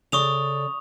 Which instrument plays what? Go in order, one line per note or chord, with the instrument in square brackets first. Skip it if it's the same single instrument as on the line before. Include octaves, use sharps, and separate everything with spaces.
[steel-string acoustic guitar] C#3 A4 D5 [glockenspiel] C#6 D#6 F7